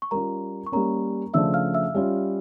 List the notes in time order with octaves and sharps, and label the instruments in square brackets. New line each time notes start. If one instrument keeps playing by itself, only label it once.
[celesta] C#6
[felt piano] G3 C#4 F4 [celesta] A#4 A#5
[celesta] C#6
[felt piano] G3 A#3 C#4 [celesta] A#4 A#5
[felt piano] C#3 F3 A3 D4 [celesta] E5 E6
[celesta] F5 F6
E5 E6
[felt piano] G3 C#4 F4